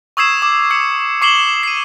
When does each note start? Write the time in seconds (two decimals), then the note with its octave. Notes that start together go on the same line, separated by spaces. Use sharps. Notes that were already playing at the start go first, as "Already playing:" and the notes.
0.17 C#6 D#6 E6 G#6 C7 E7
0.42 D6
0.71 E6 C#7
1.21 C#6 D6 C7 E7 F#7 G7
1.63 C7 D#7